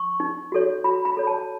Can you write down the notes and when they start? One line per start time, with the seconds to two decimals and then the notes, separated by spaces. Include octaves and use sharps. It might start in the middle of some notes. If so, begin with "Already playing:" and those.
Already playing: C#6
0.20 D#4
0.52 F#4 A4 C#5
0.84 F#4 B5
1.05 B5
1.17 A4 C#5
1.27 A5